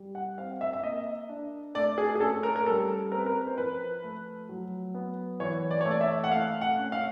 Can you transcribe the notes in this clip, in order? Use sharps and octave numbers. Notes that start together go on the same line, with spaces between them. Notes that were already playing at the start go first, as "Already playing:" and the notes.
Already playing: G3
F#5
C4 F5
E5
E5
A#3 D#5
D4
A3 D5
G#4
G#4
C#4 A4
A#4
A#4
G3 A4
C4 A#4
B4
A#4
C5
F3 B4
A3
F#3
B3
E3 C#5
D5
A3 C#5
D5
E5
F#5
A3 F5
F#5
C#4
F5